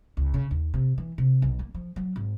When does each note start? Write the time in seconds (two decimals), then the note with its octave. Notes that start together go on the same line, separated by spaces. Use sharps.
0.17 C#2
0.34 C#3
0.51 D#2
0.74 C3
0.98 E3
1.18 C3
1.42 B1
1.59 A#3
1.74 F3
1.96 F#3
2.16 G#1